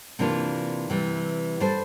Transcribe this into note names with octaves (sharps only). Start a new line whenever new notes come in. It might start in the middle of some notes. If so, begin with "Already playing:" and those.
C3 E3 A#3 D4 F4
C3 E3 G3
G3 D4 A4 C5